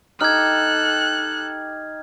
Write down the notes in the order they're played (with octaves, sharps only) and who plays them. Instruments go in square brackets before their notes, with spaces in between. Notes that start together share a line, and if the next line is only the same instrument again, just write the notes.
[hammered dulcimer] D#4 G4 [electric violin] A4 F#6 [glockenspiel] F6 G#6